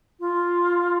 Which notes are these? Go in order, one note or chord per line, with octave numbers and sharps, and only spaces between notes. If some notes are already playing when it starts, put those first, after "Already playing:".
F4